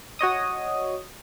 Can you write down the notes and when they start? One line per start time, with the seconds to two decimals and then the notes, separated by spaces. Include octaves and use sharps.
0.19 F#4 C#5 D#5 D#6